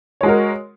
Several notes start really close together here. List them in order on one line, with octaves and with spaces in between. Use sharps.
C#5 G#3 F#4 A#4